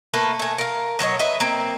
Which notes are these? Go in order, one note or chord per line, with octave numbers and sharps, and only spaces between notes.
A3 A#3 B4
A3 G#4
A#4 F5
B2 F#3 C#5 D#5
B4 D#5 E5
A#3 C4